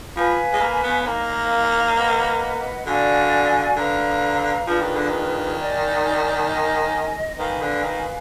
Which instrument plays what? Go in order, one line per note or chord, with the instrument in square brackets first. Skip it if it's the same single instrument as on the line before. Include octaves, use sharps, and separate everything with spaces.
[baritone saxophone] F3 [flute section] B4 F5 G#5 B5
[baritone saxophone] G#3
A#3
B3
[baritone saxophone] A#3 [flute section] D#4 A#4 F5
[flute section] B4 D#5 F#5
[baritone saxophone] D3 [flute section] F#4 D5 F5 G#5
[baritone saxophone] D3 [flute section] B4 F5 A#5
[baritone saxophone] F3 [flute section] D4 F4 G#4 B4
[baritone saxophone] D#3
D3
D#3
[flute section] D#4 A#4 D5 G#5
A#4 D#5 G#5
[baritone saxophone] D#3 [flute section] B4 F5 G#5
[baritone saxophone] D3
D#3